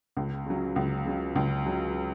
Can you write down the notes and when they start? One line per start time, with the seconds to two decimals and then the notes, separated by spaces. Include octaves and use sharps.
0.17 C#2
0.46 C#3 F#3
0.76 C#2
1.05 C#3 F#3
1.36 C#2
1.66 C#3 F#3